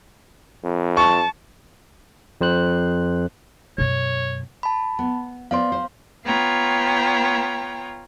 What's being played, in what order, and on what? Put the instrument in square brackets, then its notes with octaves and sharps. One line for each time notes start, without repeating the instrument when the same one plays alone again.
[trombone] F2
[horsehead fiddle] A5 [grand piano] C#6
[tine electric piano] F2 C5 F#6
[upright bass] F#2 B2 [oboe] C#5
[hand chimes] A5 B5
[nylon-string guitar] B3
[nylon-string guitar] B3 C5 D5 [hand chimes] F5 C6
[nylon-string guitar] C5
[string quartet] B3 F4 C#5 G5 A#5